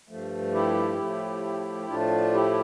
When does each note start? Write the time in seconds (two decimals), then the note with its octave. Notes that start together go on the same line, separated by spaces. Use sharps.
0.09 G2 F3 A3
0.54 E4 G4
0.99 A2 F3 A3
1.88 A2 F3 A3 D4 F4
2.33 E4 G4